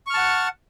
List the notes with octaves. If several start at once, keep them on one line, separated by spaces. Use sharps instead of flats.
F#5 A5 C#6 F6